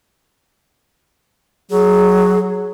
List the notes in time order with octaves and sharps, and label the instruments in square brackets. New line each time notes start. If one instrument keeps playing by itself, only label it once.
[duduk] F#3 [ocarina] G#4